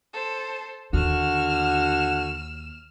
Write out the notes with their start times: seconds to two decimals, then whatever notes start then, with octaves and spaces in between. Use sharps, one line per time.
0.13 A4 C5
0.93 D#2 D3 F#4 F6 E7